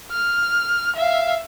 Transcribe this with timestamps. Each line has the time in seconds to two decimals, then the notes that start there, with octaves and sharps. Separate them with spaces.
0.12 F6
0.96 E5 F5